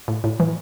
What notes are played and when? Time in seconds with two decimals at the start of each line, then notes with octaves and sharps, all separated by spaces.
0.08 A2
0.24 A2
0.40 E3